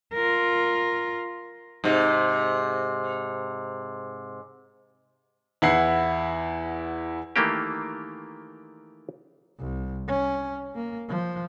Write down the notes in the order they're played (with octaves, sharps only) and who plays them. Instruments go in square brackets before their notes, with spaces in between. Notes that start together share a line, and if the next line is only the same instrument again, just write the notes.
[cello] F4 A#4
[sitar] G#2 C3
[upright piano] E2 E4 F#5 C7
[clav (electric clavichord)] D#3 E3 A3 A#3 G4
[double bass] C2
C#4
A#3
F3